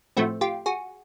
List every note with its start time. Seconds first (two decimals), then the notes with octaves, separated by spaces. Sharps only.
0.17 A2 F3 A3 C4 E4 F#4
0.41 F4 G4
0.66 F#4 G#4